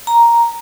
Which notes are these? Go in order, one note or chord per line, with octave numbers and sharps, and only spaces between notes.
A#5